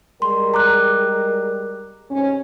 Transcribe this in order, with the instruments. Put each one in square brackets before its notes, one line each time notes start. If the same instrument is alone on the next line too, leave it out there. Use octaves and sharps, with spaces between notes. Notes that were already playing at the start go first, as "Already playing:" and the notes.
[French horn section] G3 G#3 A#4 [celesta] C6
[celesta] A#5 D6 F#6
[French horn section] G#2 C3 C#4